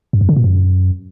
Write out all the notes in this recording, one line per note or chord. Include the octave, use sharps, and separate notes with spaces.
G2
F#2
D3
A#2
F#2